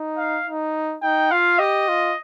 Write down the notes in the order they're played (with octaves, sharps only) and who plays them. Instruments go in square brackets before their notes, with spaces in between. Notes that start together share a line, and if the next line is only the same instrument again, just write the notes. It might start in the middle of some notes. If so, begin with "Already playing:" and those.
Already playing: [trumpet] D#4
[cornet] F5
[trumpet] D#4
[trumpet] D#4 [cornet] G5
[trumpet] F4 [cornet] F5
[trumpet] G4 [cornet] D#5
[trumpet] F4